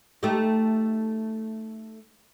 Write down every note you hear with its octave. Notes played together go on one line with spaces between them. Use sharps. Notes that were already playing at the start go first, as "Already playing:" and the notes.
A3 D#4 G4